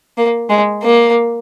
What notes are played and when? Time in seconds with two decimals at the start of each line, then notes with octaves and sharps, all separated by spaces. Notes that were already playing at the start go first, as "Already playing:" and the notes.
0.17 A#3
0.49 G#3
0.83 A#3